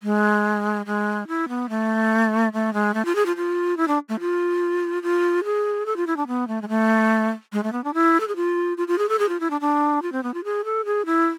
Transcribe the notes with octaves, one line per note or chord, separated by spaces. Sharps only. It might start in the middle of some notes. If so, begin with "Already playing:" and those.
G#3
G#3
E4
B3
A3
A3
G#3
A3
F4
G#4
F4
F4
E4
D4
A3
F4
F4
G#4
A4
F4
E4
D4
B3
A3
G#3
A3
G#3
A3
B3
D4
E4
A4
G#4
F4
F4
F4
G#4
A4
G#4
F4
E4
D4
D4
F4
C4
B3
F4
G#4
A4
G#4
E4